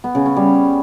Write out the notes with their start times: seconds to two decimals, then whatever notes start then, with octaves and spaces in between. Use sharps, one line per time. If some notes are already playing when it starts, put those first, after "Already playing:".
0.04 B3
0.15 C#3
0.26 C#4
0.37 G3